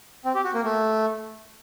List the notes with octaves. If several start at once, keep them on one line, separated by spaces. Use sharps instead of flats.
C4
G4
F#4
A#3
A3